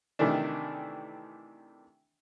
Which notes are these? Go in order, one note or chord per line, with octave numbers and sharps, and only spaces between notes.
C3 D#3 E3 A3 D4